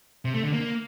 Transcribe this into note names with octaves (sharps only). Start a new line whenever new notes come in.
C3
A3
D3
A#3